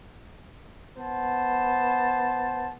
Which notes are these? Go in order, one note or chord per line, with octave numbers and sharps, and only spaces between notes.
B3 C5 A5